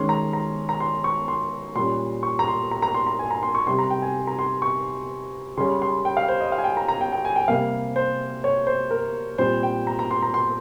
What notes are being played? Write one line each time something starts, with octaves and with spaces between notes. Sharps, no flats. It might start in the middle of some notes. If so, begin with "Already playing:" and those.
Already playing: D#3 G#3 C#4 C6
A#5
A#5
A#5
C6
C#6
C6
A#2 G3 C#4 C6
C#6
A#5
C6
A#5
A#5
C6
A#5
G#5
A#5
C6
C#6
C3 G3 C4 C6
A#5
G5
G#5
A#5
C6
C#6
C#3 G3 C#4 C6
C6
G5
F5
C5
D#5
F5
G#5
G5
A#5
A#5
G5
G5
G#5
G5
C3 G3 A#3 F5
C5
C#5
C5
A#4
A#2 G3 C4 C5
G5
A#5
A#5
C6
A#5
C6